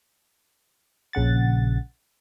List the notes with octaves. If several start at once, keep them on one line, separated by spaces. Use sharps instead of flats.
A#1 C#3 F#5 A6